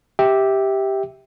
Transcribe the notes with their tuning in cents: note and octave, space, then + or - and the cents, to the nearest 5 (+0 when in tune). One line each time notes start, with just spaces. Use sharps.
G4 +0 E5 -15 G5 +0